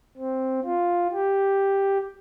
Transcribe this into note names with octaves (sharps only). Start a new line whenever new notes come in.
C4
F4
G4